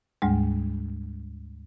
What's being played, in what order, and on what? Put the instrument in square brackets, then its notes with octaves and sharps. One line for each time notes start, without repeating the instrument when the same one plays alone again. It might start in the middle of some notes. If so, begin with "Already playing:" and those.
[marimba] D2 G#2 G3 G#3